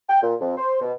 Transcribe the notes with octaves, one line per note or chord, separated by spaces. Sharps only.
G5
A#2
F2
C5
B2